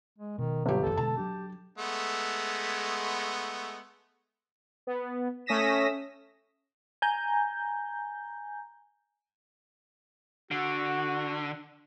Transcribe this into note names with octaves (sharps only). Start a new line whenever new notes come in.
G#3
B2 D#3
G1 F#3 G4
E1 A1 E2 A4
B2 D3 G#3 A5
F#3 D4 G4
G#3 A3 B3
B3
A3 C#4 D#6 A#6 B6 E7
G#5 A#5 G6
D3 F#4